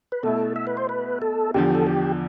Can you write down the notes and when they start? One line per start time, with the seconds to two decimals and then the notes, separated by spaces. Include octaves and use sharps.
0.12 B4
0.23 B2 A3 E4 A4
0.56 E5
0.67 B4
0.77 C5
0.89 B4
1.22 A4
1.54 E2 D3 F3 G4
1.75 A4
1.87 G4